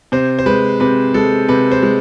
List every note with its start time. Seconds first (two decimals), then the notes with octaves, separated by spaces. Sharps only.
0.12 C3 C5
0.39 C5
0.46 G#3 B4
0.80 C3 B4
1.14 G#3 A4
1.48 C3 B4
1.72 C5
1.83 G#3